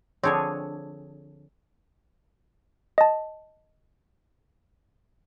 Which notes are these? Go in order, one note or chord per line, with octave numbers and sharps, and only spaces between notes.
D3 F3 C4 D4 G#4 C#5
D#5 A5